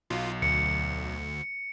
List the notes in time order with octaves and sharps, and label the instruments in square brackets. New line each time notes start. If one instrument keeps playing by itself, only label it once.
[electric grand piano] B1 F#3 [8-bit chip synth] F4
[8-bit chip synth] D2 [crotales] C#7